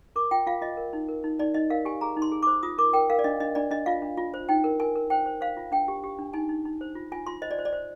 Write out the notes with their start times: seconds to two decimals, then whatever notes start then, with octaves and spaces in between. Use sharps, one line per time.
0.16 A#4 D6
0.31 F4 G5
0.47 F4 F5
0.61 F4 D#5
0.77 A#4
0.93 D#4
1.09 A#4
1.24 D#4
1.39 D#4 D5
1.54 D#4 D#5
1.70 A#4 F5
1.85 G4 G#5
2.01 G#4 A#5
2.17 D#4
2.22 C6
2.32 G#4
2.43 C5 D6
2.63 F4 D#6
2.78 A#4 D6
2.93 A#4 G5
3.10 A#4 F5
3.19 D5
3.24 D4 D#5
3.40 D4 D#5
3.55 D4 D5
3.71 D4 D#5
3.86 F4 F5
4.02 D4
4.17 F4
4.34 C5
4.49 D#4 G5
4.64 A#4
4.80 A#4 G#5
4.96 A#4
5.10 C5 G5
5.26 C5
5.41 C5 F5
5.57 F4
5.72 D4 G5
5.88 G4
6.04 G4
6.18 D4
6.33 D#4 G#5
6.49 D#4
6.65 D#4
6.81 C5
6.95 F4
7.12 F4 G#5
7.27 F4 C6
7.42 C5 D#5
7.51 D5
7.58 C5
7.65 D5
7.73 C5